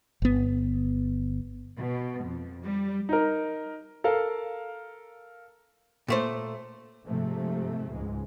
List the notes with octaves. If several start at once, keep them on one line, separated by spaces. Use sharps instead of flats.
G1 B3
B2
F2
G3
D#4 A#4
A4 A#4 F5
A#2 A3 C5
G#2 C3 F3 A3
C#2 G#2 G#3